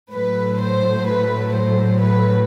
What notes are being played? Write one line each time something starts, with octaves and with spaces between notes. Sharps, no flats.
A2 F#3 A3 B4
C5
B4
C5
B4